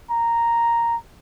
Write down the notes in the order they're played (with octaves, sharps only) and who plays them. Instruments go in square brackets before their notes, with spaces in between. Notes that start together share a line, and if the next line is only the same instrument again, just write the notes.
[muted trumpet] A#5